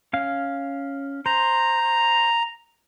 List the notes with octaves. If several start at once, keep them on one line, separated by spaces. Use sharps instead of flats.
C#4 F5
C5 A#5